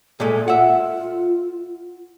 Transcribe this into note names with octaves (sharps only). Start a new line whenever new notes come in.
A#2 G#3 A3 A4
F4 E5 F#5